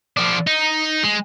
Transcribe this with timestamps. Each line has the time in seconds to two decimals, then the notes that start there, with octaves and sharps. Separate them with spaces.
0.17 F3 D4
0.47 D#4
1.03 G#3